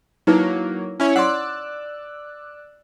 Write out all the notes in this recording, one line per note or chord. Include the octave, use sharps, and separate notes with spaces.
F#3 A#3 D#4 E4 B4
C#4 E4 C#5
D5 F#5 C6 E6 F#6